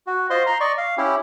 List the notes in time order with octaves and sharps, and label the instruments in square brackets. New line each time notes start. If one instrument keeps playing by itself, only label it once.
[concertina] F#4
F4 C5 D#5 C6
A#5 C6
D5 D#5 C#6
F5
C#4 E4 G4